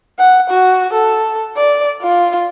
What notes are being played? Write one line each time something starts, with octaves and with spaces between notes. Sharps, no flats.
F#5
F#4
A4
D5
F4